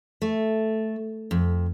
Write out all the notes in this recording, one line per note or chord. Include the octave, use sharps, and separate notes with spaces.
A3
F2